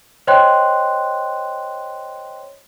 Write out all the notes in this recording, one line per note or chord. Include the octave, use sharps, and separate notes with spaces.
C5 C#5 D#5 G5 C6 F#6